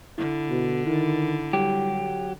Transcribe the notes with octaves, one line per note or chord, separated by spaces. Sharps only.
D3 E4
B2
D#3 E4
F#3 G3 G4